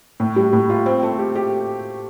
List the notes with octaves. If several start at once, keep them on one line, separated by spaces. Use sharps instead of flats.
A2
G3
A2
F4
C4
A3
G4
G4